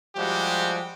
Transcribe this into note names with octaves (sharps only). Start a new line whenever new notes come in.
F3 G3 G#3 F#4 G4